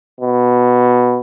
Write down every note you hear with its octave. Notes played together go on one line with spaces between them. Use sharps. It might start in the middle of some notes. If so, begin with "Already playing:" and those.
B2